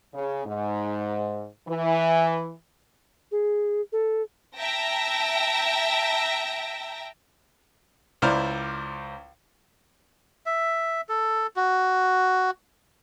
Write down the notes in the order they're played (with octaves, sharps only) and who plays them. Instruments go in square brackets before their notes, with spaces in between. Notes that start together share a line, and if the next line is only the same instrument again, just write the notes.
[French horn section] C#3
G#2
E3
[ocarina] G#4
A4
[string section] E5 G5 A5 A#5 A#6
[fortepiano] C#2 E4 C5 D5 A#5 F6
[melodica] E5
A4
F#4